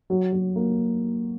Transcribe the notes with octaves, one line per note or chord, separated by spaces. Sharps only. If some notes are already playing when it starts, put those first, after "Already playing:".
F#3
F#3
A#3